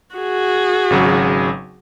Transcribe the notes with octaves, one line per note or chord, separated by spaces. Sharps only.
F#4 G#4
G#1 C#3 F#3